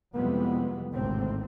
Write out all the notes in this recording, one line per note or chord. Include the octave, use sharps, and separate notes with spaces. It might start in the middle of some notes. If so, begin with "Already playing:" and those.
F2 C3 E3 G3 G#3 B3
G#1 D2 A2 C3 C4